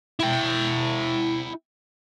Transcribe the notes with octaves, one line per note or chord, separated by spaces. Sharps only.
E4 G5